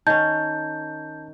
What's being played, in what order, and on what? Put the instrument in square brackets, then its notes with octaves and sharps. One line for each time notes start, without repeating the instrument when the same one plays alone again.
[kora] D#3 C#4 [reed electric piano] A5 [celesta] G6